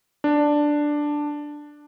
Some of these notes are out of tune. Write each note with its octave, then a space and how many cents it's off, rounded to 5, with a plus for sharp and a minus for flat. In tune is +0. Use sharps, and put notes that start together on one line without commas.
D4 +5